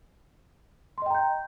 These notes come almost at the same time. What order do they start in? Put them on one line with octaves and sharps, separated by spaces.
C6 D#5 G5 A#5 G6